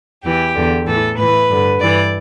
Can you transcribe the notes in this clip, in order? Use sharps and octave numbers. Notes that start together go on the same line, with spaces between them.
E2 E3 G4
E2 D3
A2 E3 A4
A2 E3 B4
G2 D3
G2 E3 D5